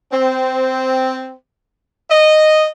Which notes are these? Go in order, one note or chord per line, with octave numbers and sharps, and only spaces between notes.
C4
D#5